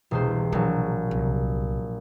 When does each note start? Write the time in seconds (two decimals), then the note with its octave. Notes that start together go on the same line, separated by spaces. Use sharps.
0.11 E1 C2 C5
0.52 A#1 F3 F#3
1.11 C2 B2